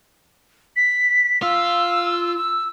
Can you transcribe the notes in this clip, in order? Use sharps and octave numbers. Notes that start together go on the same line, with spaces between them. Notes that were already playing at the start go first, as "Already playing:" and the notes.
B6
F4 E6
E6